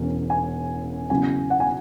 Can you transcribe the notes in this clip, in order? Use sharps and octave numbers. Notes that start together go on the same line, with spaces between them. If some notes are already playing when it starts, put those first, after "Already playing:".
Already playing: E1 E2 E3 C#4
G#5
E2 C#3 F#3 C#4 E4 G#5
F#5
G#5